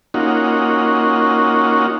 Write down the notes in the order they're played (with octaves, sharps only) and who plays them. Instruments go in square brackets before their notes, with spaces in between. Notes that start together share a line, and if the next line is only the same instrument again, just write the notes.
[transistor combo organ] A#3 C#4 D#4 F4 F#4